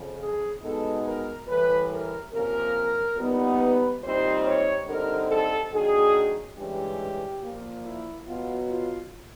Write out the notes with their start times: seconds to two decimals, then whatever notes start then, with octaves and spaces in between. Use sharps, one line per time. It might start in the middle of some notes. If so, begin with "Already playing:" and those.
Already playing: F2 C#3 F3
0.19 G#4
0.62 B2 G#3 B3 D#4 A4
1.04 A#4
1.47 A2 E3 G3 B4
1.89 A#4
2.32 C3 F3 A#3 C#4 A#4
3.16 A#2 G3 B3 D#4
3.59 B4
4.01 A#2 G3 C4 D#4 C5
4.44 C#5
4.86 D3 G3 C4 D#4 A#4
5.29 A4
5.71 D#3 F#3 A#3 D4 G#4
6.56 G2 E3 G#3 C#4 G4
7.41 A#2 F3 A#3
7.83 E4
8.25 B2 F#3 B3 F4
8.68 F4